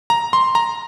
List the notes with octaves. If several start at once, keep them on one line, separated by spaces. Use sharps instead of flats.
A#5
C6
A#5